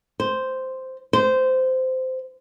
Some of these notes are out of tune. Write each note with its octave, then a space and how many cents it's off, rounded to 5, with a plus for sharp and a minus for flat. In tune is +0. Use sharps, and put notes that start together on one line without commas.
C5 -5
C5 -15